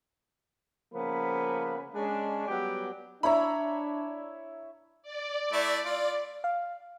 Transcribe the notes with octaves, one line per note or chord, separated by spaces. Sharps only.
C#3 F3 A#3 B3 B5
G#3 C#4 D4
F#3 G3 B3 G4
D4 E4 C#5 E5 A#5 B5
D5
A3 E4
F4
F5